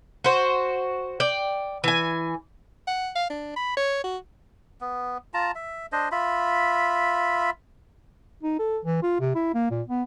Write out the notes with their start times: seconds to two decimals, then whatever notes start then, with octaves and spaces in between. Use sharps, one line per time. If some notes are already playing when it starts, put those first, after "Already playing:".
0.24 F#4 C5
1.20 D5 G5
1.84 E3 G#5
2.87 F#5
3.16 F5
3.30 D4
3.56 B5
3.77 C#5
4.04 F#4
4.81 B3
5.34 F4 A5 A#5
5.55 E5
5.92 D4 C5 D#5
6.12 F4 E5 B5
8.43 D#4
8.59 A4
8.85 E3
9.03 F4
9.20 C3
9.35 E4
9.54 A#3
9.71 A#2
9.88 B3